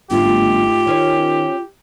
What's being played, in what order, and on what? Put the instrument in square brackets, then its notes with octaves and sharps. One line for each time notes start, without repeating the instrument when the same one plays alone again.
[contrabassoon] G1 [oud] G#2 A3 C4 [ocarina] F4 [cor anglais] G4
[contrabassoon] D#3 [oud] C#4 C5 C#5